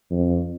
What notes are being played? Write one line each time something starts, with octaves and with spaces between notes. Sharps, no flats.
F2